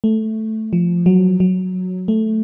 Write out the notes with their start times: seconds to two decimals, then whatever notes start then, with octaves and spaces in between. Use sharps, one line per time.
0.04 A3
0.73 F3
1.06 F#3
1.40 F#3
2.08 A3